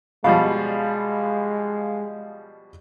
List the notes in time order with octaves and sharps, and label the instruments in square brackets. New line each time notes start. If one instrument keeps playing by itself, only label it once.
[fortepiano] B2 F3 G3 [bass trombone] G#3 [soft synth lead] F5